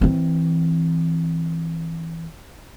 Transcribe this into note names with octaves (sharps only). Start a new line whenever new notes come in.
E3 C4